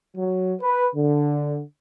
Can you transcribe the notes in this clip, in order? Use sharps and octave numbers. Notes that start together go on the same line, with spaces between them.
F#3
B4
D3